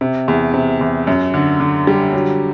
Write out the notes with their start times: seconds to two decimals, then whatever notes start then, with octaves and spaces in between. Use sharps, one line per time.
0.01 C3
0.28 E2
0.54 C3
0.81 E2
1.07 F#2
1.34 D3
1.60 D3
1.87 G3
2.13 F#3